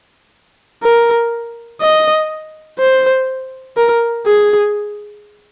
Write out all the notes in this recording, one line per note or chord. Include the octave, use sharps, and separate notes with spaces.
A#4
D#5
C5
A#4
G#4